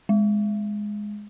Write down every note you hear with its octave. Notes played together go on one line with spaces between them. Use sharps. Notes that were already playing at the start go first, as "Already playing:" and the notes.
G#3